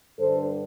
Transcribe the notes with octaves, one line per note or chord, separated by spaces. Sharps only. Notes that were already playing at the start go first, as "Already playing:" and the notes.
G2 D3 A4 C5